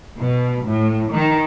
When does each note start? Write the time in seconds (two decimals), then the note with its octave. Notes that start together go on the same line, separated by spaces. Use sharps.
0.19 B2
0.67 A2
1.12 D#3